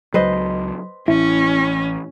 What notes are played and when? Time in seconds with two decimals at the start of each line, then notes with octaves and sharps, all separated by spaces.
0.14 C#2 F#3 B4 C5 D#5
1.08 A1 C#4 E4